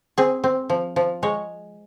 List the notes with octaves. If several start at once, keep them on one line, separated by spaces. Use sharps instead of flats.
C4 G#4
C4
F3
F3
G#3 C#5